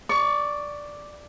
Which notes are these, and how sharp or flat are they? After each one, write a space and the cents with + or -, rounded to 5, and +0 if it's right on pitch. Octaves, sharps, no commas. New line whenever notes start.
D5 +0 C#6 +20